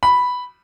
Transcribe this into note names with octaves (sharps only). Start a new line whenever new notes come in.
B5